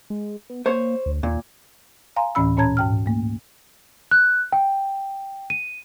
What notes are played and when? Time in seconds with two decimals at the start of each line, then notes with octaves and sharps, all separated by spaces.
0.10 G#3
0.50 B3
0.66 A#3 C5 C#5
1.06 D2
1.23 D#2 A#2
2.16 F5 G#5 A#5 C6
2.35 D2 A2 E3 C#4 B5 E6
2.57 A#2 C#4 C#5 A5 A#5 G#6
2.77 G#2 G5 F6
3.06 A3 A#3
4.11 F#6
4.53 G5
5.50 D#7